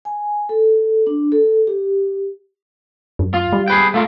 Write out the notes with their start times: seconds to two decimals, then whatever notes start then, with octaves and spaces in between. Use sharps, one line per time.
0.05 G#5
0.49 A4
1.07 D4
1.32 A4
1.67 G4
3.19 F#2
3.34 F4
3.52 G3
3.68 G#4 B4 G5
3.94 A3 F4 A#4